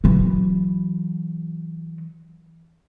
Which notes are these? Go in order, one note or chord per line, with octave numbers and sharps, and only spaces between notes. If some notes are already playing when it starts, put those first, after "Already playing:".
E3 F#3